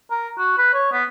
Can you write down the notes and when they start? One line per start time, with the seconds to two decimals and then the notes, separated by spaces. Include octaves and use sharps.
0.10 A#4
0.38 F#4
0.58 B4
0.73 C#5
0.92 B3